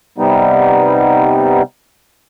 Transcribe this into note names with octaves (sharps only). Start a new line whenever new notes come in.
C3 G3 B3 D#4